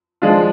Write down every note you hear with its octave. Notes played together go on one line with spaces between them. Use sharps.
F3 G#3 D4 F4